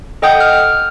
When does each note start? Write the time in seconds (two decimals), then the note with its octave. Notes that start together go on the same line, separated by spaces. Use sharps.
0.22 A4 D#5 F#5 G5 D#6 G6
0.40 F6